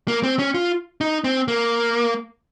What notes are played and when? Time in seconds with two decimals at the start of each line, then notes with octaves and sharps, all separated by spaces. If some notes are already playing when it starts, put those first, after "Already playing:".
0.08 A#3
0.23 C4
0.39 C#4
0.54 F4
1.01 D#4
1.24 C4
1.48 A#3